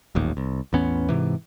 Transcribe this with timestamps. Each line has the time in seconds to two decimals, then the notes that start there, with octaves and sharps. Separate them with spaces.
0.15 D#1 A1 D#2
0.37 C2
0.73 A1 E2 B3 C#4
1.09 G#2 C3 E3